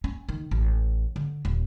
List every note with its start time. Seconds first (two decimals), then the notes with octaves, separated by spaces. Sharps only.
0.04 C#4
0.29 D#3
0.51 A1
1.16 D3
1.45 D#1